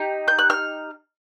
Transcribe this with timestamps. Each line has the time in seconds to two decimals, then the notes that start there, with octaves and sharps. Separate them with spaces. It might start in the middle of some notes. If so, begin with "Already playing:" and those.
Already playing: D#4 G4
0.28 G6
0.39 F#6
0.50 F6